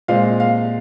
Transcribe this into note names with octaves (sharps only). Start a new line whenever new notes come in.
A#2 G#3 C4 F5
F5